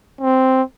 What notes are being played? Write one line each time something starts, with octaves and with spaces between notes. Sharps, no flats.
C4